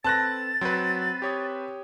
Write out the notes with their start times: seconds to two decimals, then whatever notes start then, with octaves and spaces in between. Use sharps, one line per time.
0.04 C4 A4 B4 A5 F#6 A6 A#6
0.61 F#3 C4 B4
1.22 G4 C#5 D#6